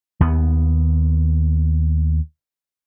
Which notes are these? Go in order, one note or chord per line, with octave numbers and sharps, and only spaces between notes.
D#2 B3